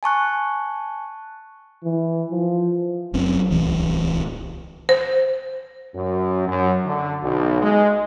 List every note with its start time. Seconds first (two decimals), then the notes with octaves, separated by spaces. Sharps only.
0.03 G#5 A5 C#6 F#6
1.84 E3
2.31 F3
3.13 F#1 F#2 C4 C#4
3.51 D1 C2 E3
4.89 C5
5.94 F#2
6.48 F#2
6.85 D3
7.21 B1
7.62 G#3